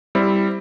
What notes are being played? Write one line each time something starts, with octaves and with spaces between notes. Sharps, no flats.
G3 C4 E4